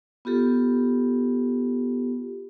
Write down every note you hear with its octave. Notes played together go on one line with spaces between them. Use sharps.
B3 F4 G4 A4